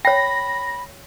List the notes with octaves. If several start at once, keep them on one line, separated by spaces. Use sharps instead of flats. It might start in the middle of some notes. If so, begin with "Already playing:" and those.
C#5 G5 B5 A#6